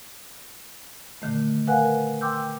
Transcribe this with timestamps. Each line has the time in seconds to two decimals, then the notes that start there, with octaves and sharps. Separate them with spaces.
1.22 A#2 D3 D#3 A3
1.67 A#4 B4 F5 F#5 G#5 F#6
2.21 G5 C6 D6 E6 G6